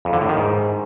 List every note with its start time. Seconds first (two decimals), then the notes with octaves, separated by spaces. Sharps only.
0.05 F2
0.13 D3
0.21 A2
0.29 D#3
0.37 G#2